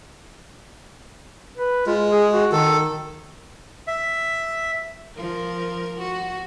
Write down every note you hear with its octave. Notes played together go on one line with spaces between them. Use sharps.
B4
G#3 F4
G#4
F#4
D#3 A4
E5
F3 A#4
F#4